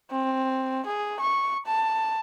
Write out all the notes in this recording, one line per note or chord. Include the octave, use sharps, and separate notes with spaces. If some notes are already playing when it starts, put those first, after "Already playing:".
C4
G#4
C#6
A5